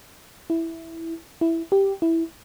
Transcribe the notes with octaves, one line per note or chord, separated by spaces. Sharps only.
E4
E4
G4
E4